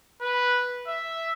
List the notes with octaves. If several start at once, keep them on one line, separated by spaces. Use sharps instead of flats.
B4
E5